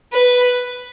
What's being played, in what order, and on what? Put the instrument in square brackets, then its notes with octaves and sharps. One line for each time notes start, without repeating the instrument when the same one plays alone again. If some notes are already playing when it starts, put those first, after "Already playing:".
[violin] B4